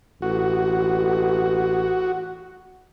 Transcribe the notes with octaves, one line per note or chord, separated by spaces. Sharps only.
A1 F#4